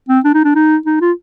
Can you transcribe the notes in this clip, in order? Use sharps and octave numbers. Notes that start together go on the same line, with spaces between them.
C4
D4
D#4
D4
D#4
D#4
F4